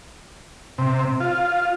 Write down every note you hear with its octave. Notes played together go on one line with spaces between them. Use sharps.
C3
F4